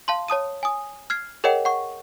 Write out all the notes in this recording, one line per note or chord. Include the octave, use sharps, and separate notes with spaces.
F5 A5 C6
C#5 A5 D#6 D#7
G#5 D#6
F6 G#6 C7
G#4 A#4 C#5 D#5 F#5 G5
F#5 C#6